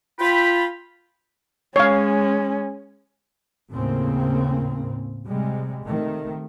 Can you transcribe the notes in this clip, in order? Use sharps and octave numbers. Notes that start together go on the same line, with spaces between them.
F4 G5 B5
G#3 C#4 C#5 F5
D#2 A2 C#3 A#3 C4
C3 G3 G#3
C3 D#3 A3